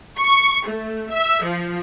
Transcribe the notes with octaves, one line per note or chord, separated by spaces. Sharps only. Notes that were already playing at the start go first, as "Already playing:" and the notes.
C#6
A3
E5
F3